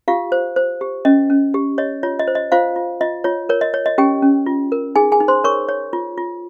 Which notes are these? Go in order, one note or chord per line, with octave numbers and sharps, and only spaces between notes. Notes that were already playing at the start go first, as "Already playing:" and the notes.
F4 G4 F5
C5
C5
G4
C#4 D#5
C#4
G4
C#5 D#5
F4 C#5
D#5
C5
D#5
F4 C5 F5
F4
F4 D#5
F4 C#5
A#4 C#5
D#5
C#5
D#5
C#4 G4 G5
C#4
F4
A#4
D#4 G#4 G#5
G#4 G#5
D#4
C5 C6
A#4 C#5 C#6
C#5
F4
F4